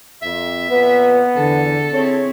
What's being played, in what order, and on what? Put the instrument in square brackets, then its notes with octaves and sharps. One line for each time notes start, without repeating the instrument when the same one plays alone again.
[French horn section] F2 [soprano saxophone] E5
[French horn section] F2 A#2 B4 [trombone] B3
[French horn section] E2 [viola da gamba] D3 [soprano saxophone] A4
[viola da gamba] C4 E4 [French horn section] G#4 C#5